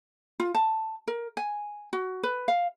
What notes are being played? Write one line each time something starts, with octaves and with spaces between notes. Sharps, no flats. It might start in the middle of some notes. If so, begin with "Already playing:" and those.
F4
A5
A#4
G#5
F#4
B4
F5